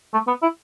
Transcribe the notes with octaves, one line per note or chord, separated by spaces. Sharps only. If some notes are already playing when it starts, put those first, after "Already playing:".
A3
B3
E4